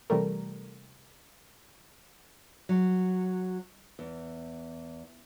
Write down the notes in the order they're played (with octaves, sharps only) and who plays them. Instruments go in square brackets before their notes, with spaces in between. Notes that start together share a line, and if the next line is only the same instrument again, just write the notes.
[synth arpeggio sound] C3 E3 G3 A3 A#4
[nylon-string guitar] F#3
E2